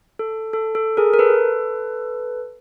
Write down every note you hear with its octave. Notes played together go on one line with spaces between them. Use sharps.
A4
A4
A4
G#4 A#4
A#4
A4 B4